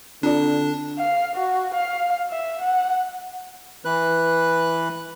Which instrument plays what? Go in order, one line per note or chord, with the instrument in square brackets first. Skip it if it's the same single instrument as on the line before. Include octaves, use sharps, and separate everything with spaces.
[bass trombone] D3 [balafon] C4 F4 D5 [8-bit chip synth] D4
[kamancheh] F5
F#4
F5
E5
F#5
[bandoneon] E3 B4 F#6